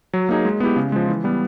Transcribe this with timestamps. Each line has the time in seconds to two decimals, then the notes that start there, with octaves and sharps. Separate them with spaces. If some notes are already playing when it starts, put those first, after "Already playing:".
0.13 F#3
0.29 A#3 D#4 G#4
0.45 G#3
0.60 B3 E4 G4
0.76 C#3
0.92 F3 G#3
1.08 E3
1.24 G3 B3